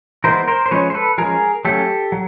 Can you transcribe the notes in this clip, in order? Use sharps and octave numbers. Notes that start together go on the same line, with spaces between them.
E3 G#3 B3 A#4 C5
A#4 C5
C5
F3 G#3 C#4 B4 C#5
C5
A4 B4
F3 G#3 C#4 G#4 A#4
F#3 A3 C#4 G4 A4
F#3